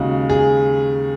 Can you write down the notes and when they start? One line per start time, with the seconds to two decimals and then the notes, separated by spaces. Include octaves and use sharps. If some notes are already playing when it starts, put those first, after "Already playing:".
Already playing: D#2 C#3 G#3 F#4
0.30 G#4